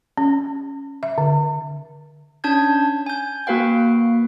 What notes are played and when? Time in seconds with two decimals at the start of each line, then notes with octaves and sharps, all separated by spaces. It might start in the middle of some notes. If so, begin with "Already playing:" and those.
0.17 C#4
1.03 E5
1.18 D3
2.44 C#4 D4 A5 G6 G#6
3.06 G#5 G6
3.47 A#3 F#4 B4 F5 G5